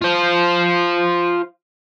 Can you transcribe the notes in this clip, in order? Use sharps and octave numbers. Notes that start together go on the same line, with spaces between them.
F4 C5